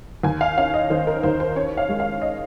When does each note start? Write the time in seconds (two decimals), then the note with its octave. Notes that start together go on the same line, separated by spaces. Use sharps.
0.23 D#2 G#5
0.41 F5
0.57 C#4 F5
0.74 D#5
0.90 D#3 C5
1.07 A#4
1.23 D#2 C5
1.40 C5
1.56 C#4 C#5
1.77 F5
1.89 G#3
2.00 F5
2.22 D#5